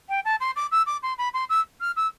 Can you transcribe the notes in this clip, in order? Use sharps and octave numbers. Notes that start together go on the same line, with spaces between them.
G5
A5
C6
D6
E6
D6
C6
B5
C6
E6
F6
E6